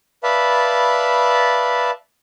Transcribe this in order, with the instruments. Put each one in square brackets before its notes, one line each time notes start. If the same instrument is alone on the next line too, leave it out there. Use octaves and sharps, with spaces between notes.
[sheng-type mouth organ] B4 D5 E5 F5 A5 B5